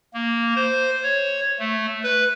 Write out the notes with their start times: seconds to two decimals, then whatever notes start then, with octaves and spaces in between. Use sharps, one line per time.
0.14 A#3
0.56 C5
1.03 C#5
1.59 A3
2.03 B4